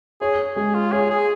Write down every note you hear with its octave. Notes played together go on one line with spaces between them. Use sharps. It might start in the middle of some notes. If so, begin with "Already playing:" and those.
G#4 C#5
G#3 G#4
F4
G#4 C#5
G#4